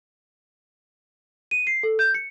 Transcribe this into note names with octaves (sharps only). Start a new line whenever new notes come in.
D#7
C7
A4
G6
C#7